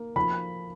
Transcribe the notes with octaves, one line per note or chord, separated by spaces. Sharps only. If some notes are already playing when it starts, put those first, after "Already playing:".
Already playing: A#3
F3 B5